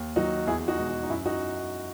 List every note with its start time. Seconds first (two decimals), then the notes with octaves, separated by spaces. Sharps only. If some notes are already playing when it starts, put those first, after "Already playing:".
Already playing: D#2
0.16 D#3 F#3 D#4 F#4
0.47 E2 E4 G#4
0.68 D#4 F#4
0.79 B2 G#3
0.89 D#4
1.03 D#4
1.10 F#2 E4
1.26 D#4 F#4